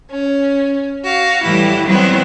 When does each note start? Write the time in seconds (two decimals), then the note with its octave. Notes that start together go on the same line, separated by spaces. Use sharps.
0.11 C#4
1.04 F#4 F5
1.42 A2 E3 G3 E4 G4
1.85 D#3 F#3 G3 B3 C4 E4